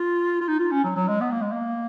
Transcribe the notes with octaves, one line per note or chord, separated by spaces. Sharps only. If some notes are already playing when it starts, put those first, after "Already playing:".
Already playing: F4
F4
D#4
F4
C#4
F#3
F#3
G#3
B3
A#3
G#3
A#3